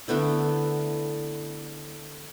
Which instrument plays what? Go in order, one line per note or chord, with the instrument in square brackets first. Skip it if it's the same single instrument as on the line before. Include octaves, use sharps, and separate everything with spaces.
[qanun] D3 A3 B3 E4